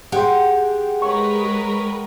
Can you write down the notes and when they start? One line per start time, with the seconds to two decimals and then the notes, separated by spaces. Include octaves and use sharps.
0.12 G4 G#4 F#5 G5 C6
1.02 G#3 A#4 B4 C#5 C#6